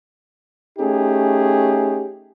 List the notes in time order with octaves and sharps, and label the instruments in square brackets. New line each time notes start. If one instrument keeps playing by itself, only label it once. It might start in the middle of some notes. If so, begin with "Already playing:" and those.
[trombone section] A3 C#4 D#4 G4 G#4